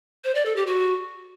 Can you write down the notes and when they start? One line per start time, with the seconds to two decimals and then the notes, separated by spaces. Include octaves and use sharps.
0.24 C5
0.35 D5
0.46 A4
0.56 G4
0.67 F#4